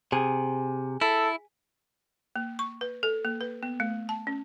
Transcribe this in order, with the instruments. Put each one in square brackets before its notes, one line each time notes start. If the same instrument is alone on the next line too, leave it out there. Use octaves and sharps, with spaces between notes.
[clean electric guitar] C3 [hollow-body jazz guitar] G#4
[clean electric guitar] E4 [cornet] A4
[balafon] A#3
C#6
B4
A4
A#3
B4
B3
A3
A5
C#4